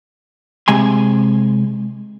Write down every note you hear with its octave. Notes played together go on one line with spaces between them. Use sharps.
C3 G#3 G#5 C6